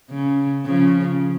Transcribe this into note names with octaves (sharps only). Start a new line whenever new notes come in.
C#3
C#3 F3